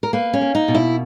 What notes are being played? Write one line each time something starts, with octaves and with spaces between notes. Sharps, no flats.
A#4
A#3 B4
C#4
A#3
D#4
B2
E4